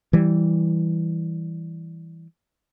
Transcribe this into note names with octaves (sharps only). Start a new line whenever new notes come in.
E3 G3